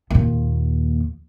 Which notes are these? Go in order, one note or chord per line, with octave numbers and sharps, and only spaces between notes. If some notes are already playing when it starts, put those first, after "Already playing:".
D#2 A#2